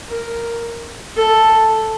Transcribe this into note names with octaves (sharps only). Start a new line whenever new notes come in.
A#4
A4